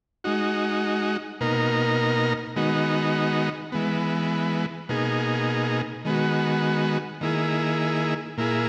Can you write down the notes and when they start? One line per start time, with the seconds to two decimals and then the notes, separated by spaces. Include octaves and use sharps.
0.24 G#3 D#4 F#4
1.41 B2 A#3 D#4 A#4
2.56 D#3 G#3 B3 D#4 F#4
3.72 E3 G#3 B3
4.89 B2 A#3 D#4 G#4
6.05 D#3 G#3 B3 F#4
7.21 D#3 A#3 E4 G#4
8.38 A#2 A#3 E4 G#4